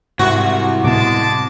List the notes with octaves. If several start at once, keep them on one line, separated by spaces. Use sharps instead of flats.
C2 G#2 F#4
A2 C3 G#3 B3 A5 D6